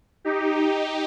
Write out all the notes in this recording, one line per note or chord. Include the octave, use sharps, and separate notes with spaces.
D#4 G4